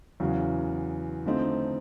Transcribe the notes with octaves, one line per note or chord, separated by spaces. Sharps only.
E2 C#3 F#3
D3 F3 A3 C4 D#4